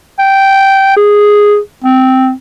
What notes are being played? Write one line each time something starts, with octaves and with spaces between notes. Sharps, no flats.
G5
G#4
C4